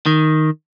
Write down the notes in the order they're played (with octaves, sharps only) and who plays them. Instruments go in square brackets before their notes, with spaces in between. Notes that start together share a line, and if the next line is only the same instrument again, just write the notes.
[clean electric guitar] D#3